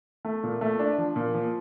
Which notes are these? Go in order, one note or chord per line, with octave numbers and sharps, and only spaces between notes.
A3
A#2
A3
D4
F3
A#2
F3